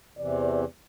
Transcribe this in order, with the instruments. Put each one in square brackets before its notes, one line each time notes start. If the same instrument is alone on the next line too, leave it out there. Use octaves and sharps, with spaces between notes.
[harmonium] E2 C3 E3 [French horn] D5